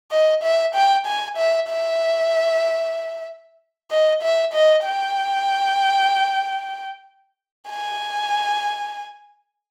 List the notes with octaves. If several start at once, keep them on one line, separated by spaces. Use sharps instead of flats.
D#5
E5
G5
G#5
E5
E5
D#5
E5
D#5
G5
G#5